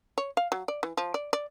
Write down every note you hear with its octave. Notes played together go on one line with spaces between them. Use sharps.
C#5
F5
F#3
D5
E3
F3
D5
D5